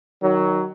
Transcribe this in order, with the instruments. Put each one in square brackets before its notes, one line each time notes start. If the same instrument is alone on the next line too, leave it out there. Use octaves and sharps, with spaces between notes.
[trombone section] D#3 F#3